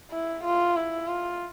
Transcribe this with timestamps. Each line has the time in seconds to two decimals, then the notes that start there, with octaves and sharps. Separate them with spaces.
0.11 E4
0.44 F4
0.76 E4
1.07 F4